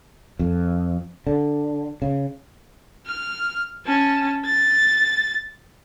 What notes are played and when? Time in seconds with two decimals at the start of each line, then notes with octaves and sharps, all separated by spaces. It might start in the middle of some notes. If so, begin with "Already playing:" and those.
0.39 F2
1.27 D3
2.02 C#3
3.06 F6
3.86 C#4 A5
4.45 A6